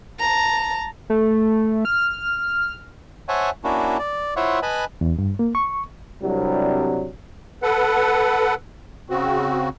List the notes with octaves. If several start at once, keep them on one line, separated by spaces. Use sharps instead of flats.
A5 A#5
A3
F6
C5 C#5 E5 F#5 G#5 A5
A#3 C#4 D4 E4 F#4
D5
E4 F4 C5 C#5 E5 F#5
B4 D#5 G#5 A5 B5
E2
G2
A#3
C#6
C2 C3 F#3 G3 D4
A4 B4 F#5
C#3 C4 F#4